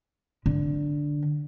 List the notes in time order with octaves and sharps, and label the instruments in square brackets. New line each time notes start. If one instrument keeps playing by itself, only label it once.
[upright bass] D3